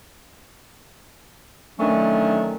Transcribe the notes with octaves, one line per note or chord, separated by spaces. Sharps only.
D3 D#3 F#3 A3 C#4 D4